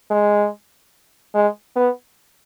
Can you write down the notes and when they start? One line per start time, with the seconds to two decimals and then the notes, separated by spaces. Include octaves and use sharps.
0.11 G#3
1.35 G#3
1.76 B3